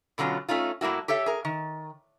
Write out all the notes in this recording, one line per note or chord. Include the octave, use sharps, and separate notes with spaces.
B2 D3 F#3 C#4 F4
A3 C#4 D#4 F4
A2 G3 A#3 E4 F#4
G4 A4 C#5 E5
G#4 A#4
D#3